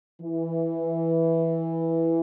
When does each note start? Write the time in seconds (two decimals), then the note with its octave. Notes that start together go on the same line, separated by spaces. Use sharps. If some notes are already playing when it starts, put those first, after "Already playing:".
0.21 E3